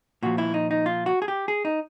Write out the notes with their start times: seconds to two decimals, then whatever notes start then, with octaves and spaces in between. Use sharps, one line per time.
0.23 A#2 F3 F#4
0.38 E4
0.54 D#4
0.71 D#4
0.86 F4
1.06 F#4
1.22 G#4
1.28 G4
1.48 G#4
1.65 D#4